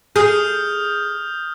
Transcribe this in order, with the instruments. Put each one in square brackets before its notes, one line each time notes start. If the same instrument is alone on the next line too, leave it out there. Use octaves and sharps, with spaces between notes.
[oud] G#4 [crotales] D#6 F6 G6